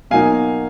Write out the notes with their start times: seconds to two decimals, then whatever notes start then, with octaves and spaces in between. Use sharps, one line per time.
0.11 B2 F#3 A#3 D#4 F5 G#5